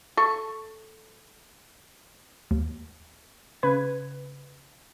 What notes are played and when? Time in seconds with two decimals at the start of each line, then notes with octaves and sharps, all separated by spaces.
0.17 A4 C#6
2.51 D#2
3.63 C#3 B4 G#6